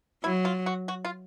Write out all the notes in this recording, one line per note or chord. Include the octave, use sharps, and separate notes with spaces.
F#3 E4
F4
F#4
F#4
F4